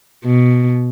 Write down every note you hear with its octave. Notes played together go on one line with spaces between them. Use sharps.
B2